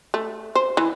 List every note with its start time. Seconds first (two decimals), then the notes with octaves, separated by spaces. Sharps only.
0.14 A3
0.55 C5
0.77 E3